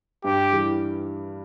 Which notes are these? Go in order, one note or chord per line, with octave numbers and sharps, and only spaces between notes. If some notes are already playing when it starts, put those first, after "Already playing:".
G2 G4
E3 G3